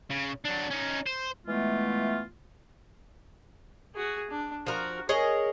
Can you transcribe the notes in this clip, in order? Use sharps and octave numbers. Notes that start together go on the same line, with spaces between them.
C#3
F#3 D4
C#4 D#4
C5
E3 G#3 A3 B3 F4
F#4 G#4
D4
F3 F#4 A#4
G#4 A#4 C#5 D#5